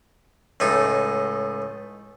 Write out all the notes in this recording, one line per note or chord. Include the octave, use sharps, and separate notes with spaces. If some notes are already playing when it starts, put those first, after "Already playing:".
C#2 A2 D#4 G#5